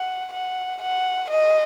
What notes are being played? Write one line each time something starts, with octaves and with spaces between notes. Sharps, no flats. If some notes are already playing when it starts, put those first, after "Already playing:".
Already playing: F#5
F#5
F#5
D#5